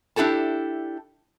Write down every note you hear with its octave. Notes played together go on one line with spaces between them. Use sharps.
D4 E4 G4 A4 A5